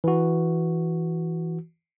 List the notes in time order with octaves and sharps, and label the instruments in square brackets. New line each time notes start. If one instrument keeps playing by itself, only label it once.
[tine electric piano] E3 F#4